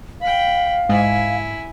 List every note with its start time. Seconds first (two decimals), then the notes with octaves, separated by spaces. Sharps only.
0.21 F5 G5 B5
0.89 G#2 E4 G#5